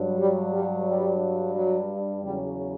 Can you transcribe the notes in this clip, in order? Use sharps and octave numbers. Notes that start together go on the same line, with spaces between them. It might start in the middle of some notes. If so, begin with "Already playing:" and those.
Already playing: G2 F#3
G3
G3
G3
F#3
E2 C#3 F#3 G3